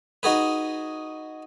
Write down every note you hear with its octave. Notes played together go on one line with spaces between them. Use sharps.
D#4 F#4 G#4 B4